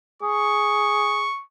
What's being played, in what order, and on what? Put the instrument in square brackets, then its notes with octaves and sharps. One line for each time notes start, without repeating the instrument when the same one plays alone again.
[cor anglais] G#4 [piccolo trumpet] C#6